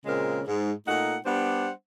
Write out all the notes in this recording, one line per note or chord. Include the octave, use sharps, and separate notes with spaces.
A#2 C#3 G#3 C4 A#4
G#2
A#2 A3 D#4 F#5
G3 B3 D4 C5 F#5